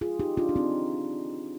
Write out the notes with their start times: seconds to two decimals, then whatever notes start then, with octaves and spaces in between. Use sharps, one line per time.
0.01 F4 G#4
0.20 D#4 G4
0.37 D4 F4
0.49 D4
0.56 C4 D#4